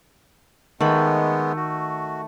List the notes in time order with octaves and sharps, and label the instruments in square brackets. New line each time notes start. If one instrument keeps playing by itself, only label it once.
[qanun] D#3 B5 [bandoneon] G#3 B3 [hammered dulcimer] A3
[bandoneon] F#4